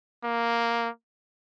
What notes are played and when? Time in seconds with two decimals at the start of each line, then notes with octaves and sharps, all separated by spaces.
0.24 A#3